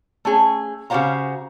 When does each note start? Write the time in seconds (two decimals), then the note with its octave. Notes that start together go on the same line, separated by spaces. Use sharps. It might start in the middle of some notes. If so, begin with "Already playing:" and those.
0.25 A3 C#4 G#4
0.90 C#3 F#4 G4 C5 F5 A#5